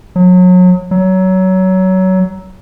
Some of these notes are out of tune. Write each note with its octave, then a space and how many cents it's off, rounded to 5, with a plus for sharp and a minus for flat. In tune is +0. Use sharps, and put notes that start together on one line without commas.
F#3 -30
F#3 +20